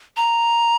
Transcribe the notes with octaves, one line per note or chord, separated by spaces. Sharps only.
A#5